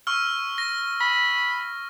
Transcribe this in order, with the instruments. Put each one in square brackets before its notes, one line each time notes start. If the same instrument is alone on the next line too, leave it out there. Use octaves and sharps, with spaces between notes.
[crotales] C#6 E6 F6
A#6
[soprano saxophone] B5